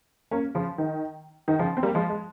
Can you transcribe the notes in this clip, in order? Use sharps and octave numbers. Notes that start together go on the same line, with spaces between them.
A#3 C#4
C#3 F3
D#3
D#3
C#3 F3
C4
G3 A#3
F3 G#3
G#3